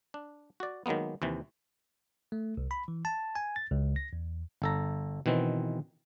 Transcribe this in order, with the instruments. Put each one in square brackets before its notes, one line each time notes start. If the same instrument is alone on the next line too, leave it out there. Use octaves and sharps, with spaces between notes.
[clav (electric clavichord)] D4
F#4 D5
D#3 F#3 G#3 A#3 B3
D#2 C3 E3
[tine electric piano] A3
C2
B5
E3
A5
G#5
A6
C#2
A#6
E2
[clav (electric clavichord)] G1 A4 A#5
B2 D#3 E3 C4